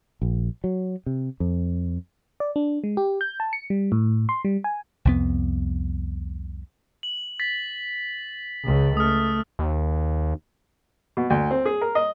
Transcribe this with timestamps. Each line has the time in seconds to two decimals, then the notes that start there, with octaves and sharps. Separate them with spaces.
0.22 A#1
0.64 F#3
1.06 C3
1.40 F2
2.40 D5
2.56 D4
2.84 G#3
2.97 G4
3.21 G6
3.40 A5
3.53 C#7
3.70 G3
3.92 A2
4.29 C6
4.45 G3
4.64 G#5
5.05 C2 F2 B3
7.03 F#7
7.40 A6 B6
8.65 C#2 C#3
8.97 A3 D#6 F6
9.59 D#2
11.17 B2
11.30 D2
11.51 C4
11.66 G#4
11.82 A#4
11.95 D#5